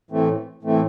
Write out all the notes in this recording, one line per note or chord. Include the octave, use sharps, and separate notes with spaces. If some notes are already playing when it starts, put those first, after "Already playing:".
A2 E3 A3 C4
A2 E3 A3 C4